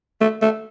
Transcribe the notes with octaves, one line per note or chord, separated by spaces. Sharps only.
A3
A3